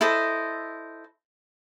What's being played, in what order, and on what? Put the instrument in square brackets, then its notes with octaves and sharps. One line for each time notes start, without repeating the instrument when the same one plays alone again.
[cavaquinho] E4 A4 C5 D#5